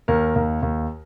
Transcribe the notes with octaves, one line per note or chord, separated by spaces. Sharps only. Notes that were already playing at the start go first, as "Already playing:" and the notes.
D#2 A#4
D#2
D#2